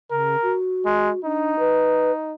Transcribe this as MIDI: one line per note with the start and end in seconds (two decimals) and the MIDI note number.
0.11 0.36 49
0.11 0.56 70
0.42 1.22 66
0.85 1.10 56
1.24 1.58 62
1.24 2.34 63
1.59 2.11 71